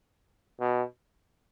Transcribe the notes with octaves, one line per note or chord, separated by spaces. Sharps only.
B2